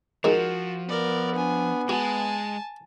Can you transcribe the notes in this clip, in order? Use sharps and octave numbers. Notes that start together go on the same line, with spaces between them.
D#3 F3 G#3 F#4
B3 A#4 D5
D4 G#5
G#3 F#4 G#5 A5